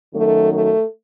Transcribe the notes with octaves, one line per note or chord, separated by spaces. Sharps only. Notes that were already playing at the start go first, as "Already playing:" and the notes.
F#2 D#3 F#3 A3
A3